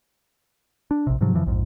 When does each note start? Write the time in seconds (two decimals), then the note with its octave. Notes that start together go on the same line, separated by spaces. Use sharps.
0.91 D4
1.07 A#1 C3
1.21 G#2 C3 F3 F#3
1.34 F2 C#3 E3 F3
1.46 A#1 F2 G#2